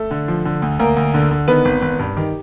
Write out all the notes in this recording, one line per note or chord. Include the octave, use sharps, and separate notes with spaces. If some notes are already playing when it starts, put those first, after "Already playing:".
Already playing: A3 A4
D3
F3
D3
D2
D2 A#3 A#4
D2
D3
D3
D#3 B3 B4
G#1
G#1
G2
D#3 G4